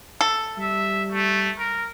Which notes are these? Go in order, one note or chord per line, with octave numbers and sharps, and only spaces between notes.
A4
G3 E5
A3
A#4